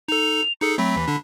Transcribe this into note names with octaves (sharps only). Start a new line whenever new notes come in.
D#4 A4 F7
D#4 G#4 A4 C#7
F#3 A3 C4 B5
D#2 E3
D3 D4